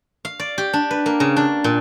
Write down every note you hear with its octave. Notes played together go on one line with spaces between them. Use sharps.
F5
D5
G4
D4
B4
A#3
C#3
D4
A#2